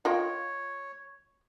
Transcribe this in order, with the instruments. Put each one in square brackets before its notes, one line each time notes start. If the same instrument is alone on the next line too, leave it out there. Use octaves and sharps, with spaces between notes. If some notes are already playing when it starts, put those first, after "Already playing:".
[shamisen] F4 D#5 G5 [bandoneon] C#5